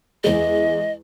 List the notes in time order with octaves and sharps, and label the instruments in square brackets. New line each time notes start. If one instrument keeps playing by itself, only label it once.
[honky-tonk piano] E2 G#3 [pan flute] D#5